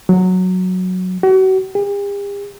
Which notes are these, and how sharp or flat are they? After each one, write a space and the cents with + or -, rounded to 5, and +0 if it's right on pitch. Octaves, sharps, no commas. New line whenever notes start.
F#3 -5
F#4 +35
G4 +45